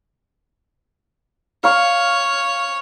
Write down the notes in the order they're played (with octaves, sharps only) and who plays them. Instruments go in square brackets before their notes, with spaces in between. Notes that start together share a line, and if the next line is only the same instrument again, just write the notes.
[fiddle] C#5 [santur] F5 C#6